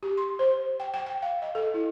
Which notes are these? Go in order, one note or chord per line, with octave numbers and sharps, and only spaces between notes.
G4
C6
C5
G5
G5
G5
F5
D#5
A4
E4